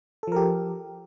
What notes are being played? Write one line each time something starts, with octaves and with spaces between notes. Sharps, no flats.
F3 G4 A4 A#4